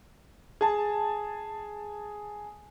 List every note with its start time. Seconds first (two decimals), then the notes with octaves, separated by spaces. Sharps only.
0.61 G#4 A5